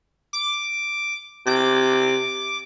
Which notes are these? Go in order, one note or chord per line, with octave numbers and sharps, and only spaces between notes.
D6
C3 D6